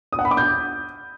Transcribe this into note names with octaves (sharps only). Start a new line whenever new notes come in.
D#6
F#5
B5
D6
G6